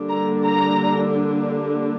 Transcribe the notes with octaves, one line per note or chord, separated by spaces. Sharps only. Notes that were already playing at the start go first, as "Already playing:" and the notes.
Already playing: D3 G3 A#3 D4
A#5
A#5